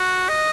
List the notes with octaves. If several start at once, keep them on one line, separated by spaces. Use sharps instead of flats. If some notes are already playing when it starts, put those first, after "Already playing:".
Already playing: F#4
D#5